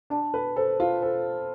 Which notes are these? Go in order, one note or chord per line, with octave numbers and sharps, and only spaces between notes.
D4 A5
B4
A4 C5
F4
A4 C5